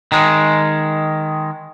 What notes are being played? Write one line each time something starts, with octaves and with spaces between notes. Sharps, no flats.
D#3 G#3